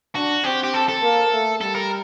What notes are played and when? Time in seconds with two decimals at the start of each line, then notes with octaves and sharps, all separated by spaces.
0.15 D4 F#4
0.44 C4 G4
0.64 G4
0.74 A4
0.89 A4
1.02 A#3
1.32 A3
1.61 G3 A4
1.75 A#4